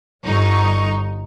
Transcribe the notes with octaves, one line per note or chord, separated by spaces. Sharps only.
G1 D#4 C#6